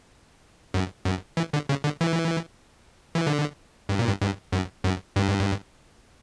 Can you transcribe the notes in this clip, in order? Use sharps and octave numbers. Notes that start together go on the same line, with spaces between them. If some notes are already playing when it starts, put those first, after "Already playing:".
F#2
F#2
E3
D3
C#3
D3
E3
E3
D3
G2
A#2
G2
G2
F#2
F#2
G2